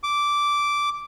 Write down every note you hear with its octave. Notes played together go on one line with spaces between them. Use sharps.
D6